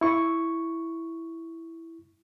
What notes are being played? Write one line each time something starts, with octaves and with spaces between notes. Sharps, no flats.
E4 C#6